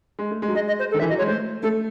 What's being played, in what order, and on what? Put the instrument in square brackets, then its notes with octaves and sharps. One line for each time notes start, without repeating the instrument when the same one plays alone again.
[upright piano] G#3
A3
G#3
F#3
[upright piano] G#3 [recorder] D#5
[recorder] D#5
C5
A4
[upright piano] D#3
[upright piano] E3 [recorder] E5
[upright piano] F#3 [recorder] D#5
[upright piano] G#3 [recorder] C#5
[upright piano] A3 [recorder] C5
[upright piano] A3 [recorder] A4